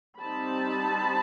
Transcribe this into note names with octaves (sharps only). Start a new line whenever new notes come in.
G3 C4 D#4 A5 B5